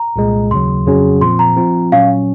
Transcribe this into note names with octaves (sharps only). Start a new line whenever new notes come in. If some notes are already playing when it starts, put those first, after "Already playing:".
Already playing: A#5
C2 A#2 G#3
D#2 C#3 F#3 C6
F2 C#3 F#3 C#4 G#4
A#2 F3 C4 C6
A#5
F3 C4 F4
A#2 F#3 C#4 F5